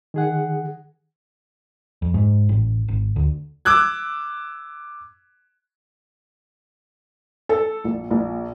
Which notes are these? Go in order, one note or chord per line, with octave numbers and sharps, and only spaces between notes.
D#3 G#4 F#5
F2
G#2
A1
G#1
D2
D6 E6 F#6 G#6
A4
A#1
A#1